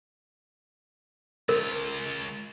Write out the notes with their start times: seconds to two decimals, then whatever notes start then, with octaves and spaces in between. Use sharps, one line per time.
1.49 C#2 F4 A#4